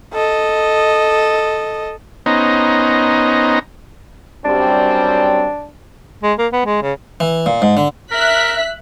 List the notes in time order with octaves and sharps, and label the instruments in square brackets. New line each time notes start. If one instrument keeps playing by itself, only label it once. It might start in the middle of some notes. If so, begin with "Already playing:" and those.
[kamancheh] A4 D#5
[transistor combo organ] B3 C#4 D#4 C5 D#5 A#5
[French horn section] F#2 G3 C4 [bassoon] D4
[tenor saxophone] G#3
A#3
B3
G#3
C#3
[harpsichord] E3
A#2
G#2
D3
[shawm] A#4 [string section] E5 F#6 B6